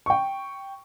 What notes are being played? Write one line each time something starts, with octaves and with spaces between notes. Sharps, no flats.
G5 C#6